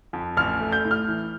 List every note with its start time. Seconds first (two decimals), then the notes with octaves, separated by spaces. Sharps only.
0.13 F2
0.37 A1 F6
0.60 A3
0.72 G6
0.85 A2
0.91 F6
1.08 E3